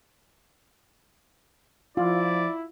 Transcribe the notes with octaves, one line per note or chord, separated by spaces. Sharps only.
F3 E4 F4 D5